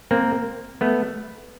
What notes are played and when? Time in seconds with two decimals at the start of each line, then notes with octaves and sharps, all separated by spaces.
0.11 A#3 C4
0.81 A3 B3